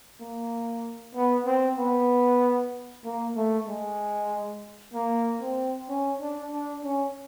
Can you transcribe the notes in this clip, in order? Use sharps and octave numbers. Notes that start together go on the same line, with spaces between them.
A#3
B3
C4
B3
A#3
A3
G#3
A#3
C4
C#4
D4
D4
C#4